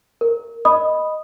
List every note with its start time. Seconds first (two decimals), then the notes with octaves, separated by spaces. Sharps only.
0.21 A#4
0.65 D#5 B5 D#6